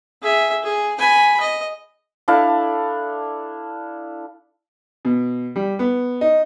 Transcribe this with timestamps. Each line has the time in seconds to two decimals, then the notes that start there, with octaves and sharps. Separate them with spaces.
0.22 G#4 E5
0.64 G#4
0.99 G#5 B5
1.40 D#5
2.28 D4 E4 A4 F5
5.05 B2
5.56 G3
5.79 B3
6.21 D#4